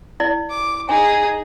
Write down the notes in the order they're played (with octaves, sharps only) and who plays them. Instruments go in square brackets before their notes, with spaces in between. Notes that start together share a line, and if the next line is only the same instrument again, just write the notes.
[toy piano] E4 D5
[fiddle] D6
[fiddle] D#4 G#4 [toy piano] G#5